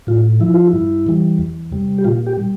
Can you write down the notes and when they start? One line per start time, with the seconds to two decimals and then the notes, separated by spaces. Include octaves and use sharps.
0.07 A2 F4
0.40 F3 E4
0.54 F4
0.67 E4
0.73 G2
1.07 E3 G3
1.38 E2
1.72 C3 G3
1.98 G4
2.04 A#2 F4
2.26 G4
2.37 G3